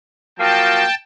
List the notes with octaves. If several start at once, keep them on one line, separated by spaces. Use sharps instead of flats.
F3 F#3 A#3 G5 A5